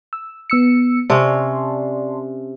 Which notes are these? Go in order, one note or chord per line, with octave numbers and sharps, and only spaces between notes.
E6
B3 E6 C#7
C3 C#4 D5 A5 C6